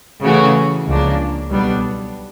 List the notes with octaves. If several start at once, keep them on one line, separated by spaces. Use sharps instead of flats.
C#3 E3 A3 C#4 F#4
C#2 C#3 F3 A#3 D4
B1 B2 G3 B3 D4